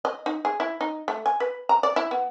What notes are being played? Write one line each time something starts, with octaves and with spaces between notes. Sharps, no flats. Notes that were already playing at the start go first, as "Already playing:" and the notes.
D#5
D#4
G#4
E4
D#4
A3
G#5
B4
A#5
D5
E4
B3